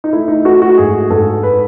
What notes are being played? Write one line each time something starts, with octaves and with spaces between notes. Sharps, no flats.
D#4
A3 E4
D#4
A3 F#4
F#4
G#2 G#4
G#2 A4
B4